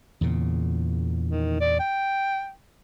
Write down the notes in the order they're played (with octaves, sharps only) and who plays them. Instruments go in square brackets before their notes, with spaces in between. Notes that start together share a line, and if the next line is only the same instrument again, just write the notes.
[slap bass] E2 A#2 C#3
[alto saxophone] D#3
D5
G5